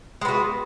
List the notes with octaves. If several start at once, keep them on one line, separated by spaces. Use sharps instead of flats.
G#3 B3 F#4